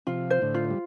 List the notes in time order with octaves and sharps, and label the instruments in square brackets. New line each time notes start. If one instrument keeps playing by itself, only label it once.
[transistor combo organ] C3 F3 [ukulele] F4
[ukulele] C5
[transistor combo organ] A2 D3
[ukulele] F4
[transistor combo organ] G3